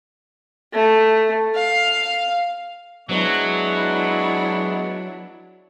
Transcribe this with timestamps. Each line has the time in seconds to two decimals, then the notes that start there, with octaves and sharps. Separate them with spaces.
0.73 A3
1.56 F5
3.09 F#3 G#3 B3 D4 E4 C#6